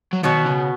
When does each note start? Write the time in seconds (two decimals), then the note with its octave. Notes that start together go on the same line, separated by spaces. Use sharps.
0.13 F#3
0.23 B2 D#3 B3 F#4 C#5
0.46 C#3